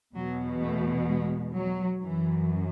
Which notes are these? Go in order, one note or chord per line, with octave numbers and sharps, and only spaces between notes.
E2 B2 F#3
A3
G#3
F#3
F#2 E3